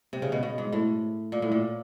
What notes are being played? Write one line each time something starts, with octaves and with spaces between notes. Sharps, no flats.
C3
C#3
B2
B2
G#2
A2
A#2
A2
A#2